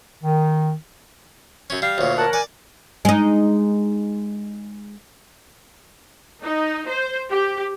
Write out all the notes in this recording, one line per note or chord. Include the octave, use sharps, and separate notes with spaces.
D#3
F#2 C#4
G3 F5
D2 A#2 C#5
A#4 C#5 F#5 A5
D5 G#5
G#3 D#4
D#4
C5
G4